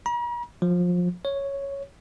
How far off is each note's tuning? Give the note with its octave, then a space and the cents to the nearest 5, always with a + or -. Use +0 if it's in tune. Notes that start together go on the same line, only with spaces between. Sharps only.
A#5 +45
F3 +25
C#5 +0